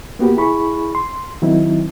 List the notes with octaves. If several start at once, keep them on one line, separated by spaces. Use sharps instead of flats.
A#3 B3 F#4 G4 B4
E4 G#4 B5 C#6
C6
D#3 F#3 C4 D#4 E4